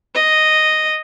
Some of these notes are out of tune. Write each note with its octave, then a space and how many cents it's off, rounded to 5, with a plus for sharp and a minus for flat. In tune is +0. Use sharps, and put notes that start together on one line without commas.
D#5 -5